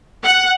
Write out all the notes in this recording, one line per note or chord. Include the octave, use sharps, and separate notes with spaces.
F#5